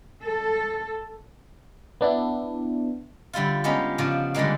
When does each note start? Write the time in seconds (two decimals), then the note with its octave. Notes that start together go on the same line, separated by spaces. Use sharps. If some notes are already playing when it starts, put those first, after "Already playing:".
0.23 A4
2.01 B3 D4 E4
3.33 D3 G3 E4 F4
3.64 G#3 B3 C#4 D#4 G4
3.98 C#3 F3 D4 C#5
4.34 D3 E3 G3 G#3 A#3